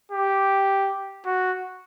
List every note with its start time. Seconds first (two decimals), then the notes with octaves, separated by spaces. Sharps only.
0.12 G4
1.26 F#4